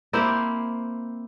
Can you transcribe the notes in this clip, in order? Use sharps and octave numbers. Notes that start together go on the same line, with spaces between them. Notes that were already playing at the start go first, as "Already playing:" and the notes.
A#3 C4 E4 G4